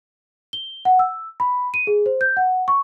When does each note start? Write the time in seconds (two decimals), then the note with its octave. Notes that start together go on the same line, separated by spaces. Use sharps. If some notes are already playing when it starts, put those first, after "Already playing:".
0.53 G7
0.85 F#5
0.99 E6
1.40 B5
1.74 D#7
1.87 G#4
2.06 C5
2.21 G6
2.37 F#5
2.68 C#6